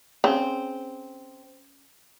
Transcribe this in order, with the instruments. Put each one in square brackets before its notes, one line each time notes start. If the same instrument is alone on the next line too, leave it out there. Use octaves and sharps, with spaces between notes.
[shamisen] C#3 [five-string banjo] C4